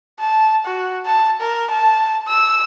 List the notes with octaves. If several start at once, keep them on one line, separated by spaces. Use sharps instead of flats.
A5
F#4
A5
A#4
A5
E6